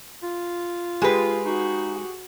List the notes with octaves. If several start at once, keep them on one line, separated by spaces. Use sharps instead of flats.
F4
G#3 G4 G#4 B4
D#4 F#4